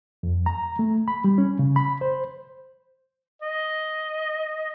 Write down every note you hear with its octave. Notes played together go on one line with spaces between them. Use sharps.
F2
A#5
A3
B5
G3
C#4
C#3
B5
C5
D#5